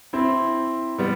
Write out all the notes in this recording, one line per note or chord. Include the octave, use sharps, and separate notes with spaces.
C4 E4
G3 B3